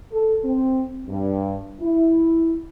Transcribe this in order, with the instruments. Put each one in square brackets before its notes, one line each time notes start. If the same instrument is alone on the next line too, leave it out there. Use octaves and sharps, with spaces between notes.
[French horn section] A4
C4
G2
E4